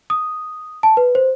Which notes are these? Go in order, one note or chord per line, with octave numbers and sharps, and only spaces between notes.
D#6
A5
B4
C5